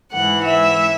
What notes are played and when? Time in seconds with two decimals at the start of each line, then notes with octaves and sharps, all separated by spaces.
0.12 G#2 E3 F#5
0.45 E5